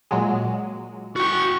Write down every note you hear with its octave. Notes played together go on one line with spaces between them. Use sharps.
A#2 F#3 G#3
F#4 G5 C#6